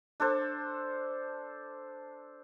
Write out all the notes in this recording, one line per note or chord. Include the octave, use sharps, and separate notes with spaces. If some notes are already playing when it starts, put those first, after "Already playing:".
D4 A4 C5